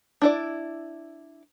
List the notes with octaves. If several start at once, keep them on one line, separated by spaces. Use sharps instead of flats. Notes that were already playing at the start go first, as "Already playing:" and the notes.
D4 E4 D5